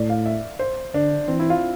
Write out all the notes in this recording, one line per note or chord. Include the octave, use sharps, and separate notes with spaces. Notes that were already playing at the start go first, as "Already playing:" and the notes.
Already playing: A2 D5
F5
E5
C5
D3 D4
E3 C4
E4
F4